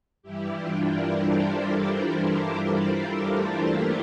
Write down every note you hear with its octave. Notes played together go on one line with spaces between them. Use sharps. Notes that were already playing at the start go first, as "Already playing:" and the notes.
G2 E3 G3 E4 G4
D4 F4
A#4 D5
A4 C5
A4 C5
F4 A4
D4 F4
A3
A#3